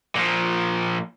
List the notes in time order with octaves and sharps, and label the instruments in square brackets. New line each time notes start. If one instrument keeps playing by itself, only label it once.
[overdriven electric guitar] A#2 F3